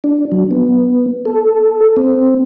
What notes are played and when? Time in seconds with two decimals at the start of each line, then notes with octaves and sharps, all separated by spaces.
0.04 D4
0.32 F#3
0.51 B3
1.25 A4
1.97 C4